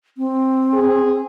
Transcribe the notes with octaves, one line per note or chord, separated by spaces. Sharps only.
C4
G#4